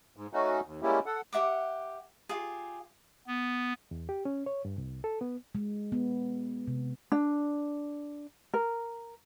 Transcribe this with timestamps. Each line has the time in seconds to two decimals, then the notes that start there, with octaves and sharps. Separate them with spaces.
0.17 G#2
0.33 A3 C#4 D#4 F#4
0.66 D#2
0.83 G3 G#3 A#3 C#4 E4 G4
1.06 A4 F#5
1.32 G4 E5 F#5 D6
2.29 F4 G4 G#4
3.27 B3
3.91 E2
4.09 G4
4.25 C#4
4.46 C#5
4.65 G2
4.78 C2
5.04 A4
5.21 B3
5.55 G#3
5.92 B3
6.67 C3
7.12 D4
8.54 A#4